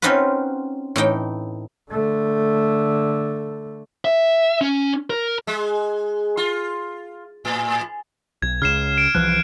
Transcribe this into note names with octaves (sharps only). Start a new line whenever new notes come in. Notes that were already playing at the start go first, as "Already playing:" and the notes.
C4 C#4 D#4 F4 F#4 B4
A2 E3 D#4 G5
D3 A3
E5
C#4
A#4
G#3
F4
A2
B1 G#6
C#2 C#3 F6 C7 E7
D7
C2 E3 F3 F#6